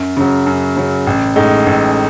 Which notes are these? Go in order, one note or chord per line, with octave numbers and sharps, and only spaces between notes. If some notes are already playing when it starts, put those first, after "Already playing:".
Already playing: F#2
C#3 F#3
F#2
C#3 F#3
A1
A2 G#3 D#4
A1